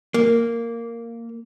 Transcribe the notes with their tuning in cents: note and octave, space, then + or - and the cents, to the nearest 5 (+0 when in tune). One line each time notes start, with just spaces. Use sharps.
A#3 -10